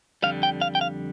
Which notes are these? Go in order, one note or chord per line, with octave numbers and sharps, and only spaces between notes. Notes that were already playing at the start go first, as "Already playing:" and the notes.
F2 D3 G3 F5
G5
F5
G5
F5